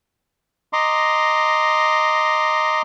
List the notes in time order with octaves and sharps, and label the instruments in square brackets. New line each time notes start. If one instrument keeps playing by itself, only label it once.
[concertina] D#5 A#5 C6 D6